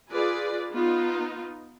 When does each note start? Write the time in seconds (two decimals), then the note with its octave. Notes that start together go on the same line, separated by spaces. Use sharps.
0.11 F4 G#4 B4 D5
0.72 B3 D#4 F4